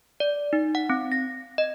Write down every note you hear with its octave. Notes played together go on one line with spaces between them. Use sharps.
D5
D#4
F#5
C4
A#6
D#5